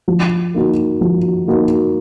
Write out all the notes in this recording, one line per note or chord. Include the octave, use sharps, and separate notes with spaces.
F3
A#3 D#4 F#4
F3
A#3 D#4 F#4